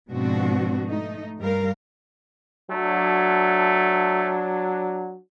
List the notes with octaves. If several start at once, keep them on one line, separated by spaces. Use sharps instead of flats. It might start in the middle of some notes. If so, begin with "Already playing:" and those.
G#2 B2 F3 C4 D4 F#4
A3 D#4
G2 G3 A#4 F5
F#3 A3 D4